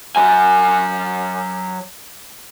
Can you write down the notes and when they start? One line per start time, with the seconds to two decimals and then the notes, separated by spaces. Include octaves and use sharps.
0.16 F#3 G#5